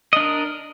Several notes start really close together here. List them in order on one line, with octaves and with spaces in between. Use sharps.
D#5 D4 A#4